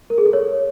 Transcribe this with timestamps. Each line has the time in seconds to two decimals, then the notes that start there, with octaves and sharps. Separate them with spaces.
0.10 A#4
0.18 G#4
0.26 A4
0.33 C#5